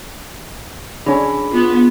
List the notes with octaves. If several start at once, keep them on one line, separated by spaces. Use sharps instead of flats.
D3 C#4 D4 G#4 B5
B3 F4